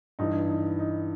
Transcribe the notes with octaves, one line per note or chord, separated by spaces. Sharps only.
G2 E3 D#4
D#4
D#4